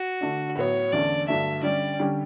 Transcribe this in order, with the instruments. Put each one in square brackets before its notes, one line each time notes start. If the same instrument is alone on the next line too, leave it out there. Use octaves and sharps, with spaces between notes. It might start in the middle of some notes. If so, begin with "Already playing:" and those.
Already playing: [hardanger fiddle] F#4
[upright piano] D3 A3 D4
[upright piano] A2 F#3 B3 F#4 [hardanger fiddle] C#5
[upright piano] E2 D3 A3 C#4 [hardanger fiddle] D5
[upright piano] G2 D3 F#3 A3 [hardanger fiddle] E5
[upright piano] D3 G3 C#4 G4 [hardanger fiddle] D5
[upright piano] D3 G3 C#4 G4